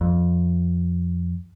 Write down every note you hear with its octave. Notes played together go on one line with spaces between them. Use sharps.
F2